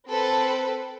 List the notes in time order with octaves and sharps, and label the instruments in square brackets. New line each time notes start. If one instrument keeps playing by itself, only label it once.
[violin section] C4 A4 B4 C5